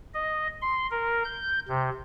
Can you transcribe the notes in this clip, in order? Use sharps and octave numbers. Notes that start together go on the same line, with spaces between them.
D#5
C6
A#4
G6
C3